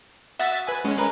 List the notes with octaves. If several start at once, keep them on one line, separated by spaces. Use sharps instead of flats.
F#4 E5 D#6 A6 B6
B4 G#5
G#3 C#4
A#4 B4